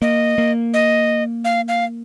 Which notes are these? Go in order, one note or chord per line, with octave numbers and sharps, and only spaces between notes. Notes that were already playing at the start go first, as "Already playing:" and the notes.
A#3 D#5
A#3
D#5
F5
F5